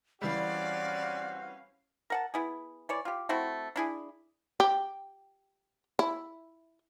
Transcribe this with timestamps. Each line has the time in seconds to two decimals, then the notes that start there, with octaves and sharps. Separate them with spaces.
0.22 E3 G3 C4 C#4 F#4 D5 F5
2.10 A#4 F#5 A5
2.34 B3 E4 G#4
2.89 E3 C#5 D5
3.05 F4 G4
3.29 A3 C4 E4 F#4
3.76 D4 E4 G#4
4.60 G4
5.99 E4